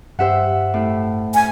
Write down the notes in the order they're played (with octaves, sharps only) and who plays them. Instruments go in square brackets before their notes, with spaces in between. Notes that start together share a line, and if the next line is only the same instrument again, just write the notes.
[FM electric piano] G2 G4 [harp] C5 E5 F#5
[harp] A2
[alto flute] G#5